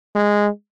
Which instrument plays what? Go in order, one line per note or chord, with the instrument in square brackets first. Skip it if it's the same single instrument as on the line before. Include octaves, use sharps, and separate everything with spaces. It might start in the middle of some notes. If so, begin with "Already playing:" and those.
[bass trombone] G#3